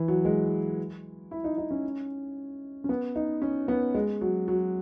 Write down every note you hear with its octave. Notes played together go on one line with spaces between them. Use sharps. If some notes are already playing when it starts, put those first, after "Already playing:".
Already playing: E3
F#3
G#3
E4
D#4
D#4
C#4
C#4
B3
D#4
C#4
B3
G#3
F#3
F#3